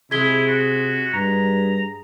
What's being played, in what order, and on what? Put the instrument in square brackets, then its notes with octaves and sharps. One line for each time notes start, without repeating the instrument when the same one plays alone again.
[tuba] C3 [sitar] G#3 [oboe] E4 [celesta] G#6 B6 G7
[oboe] F#4
[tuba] G2 [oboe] A#5